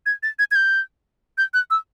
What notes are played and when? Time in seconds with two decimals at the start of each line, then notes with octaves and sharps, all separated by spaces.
0.06 G#6
0.23 A6
0.39 G#6
0.51 G#6
0.55 G6
1.38 G6
1.54 F#6
1.71 E6